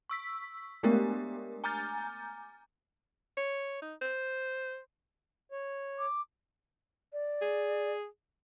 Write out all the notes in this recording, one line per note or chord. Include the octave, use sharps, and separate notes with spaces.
C#6 E6 B6
G#3 A3 B3 D4 G4 A#4
G#5 A#5 D6 F6 G6 A6
C#5
D#4
C5
C#5
D6
D5
G#4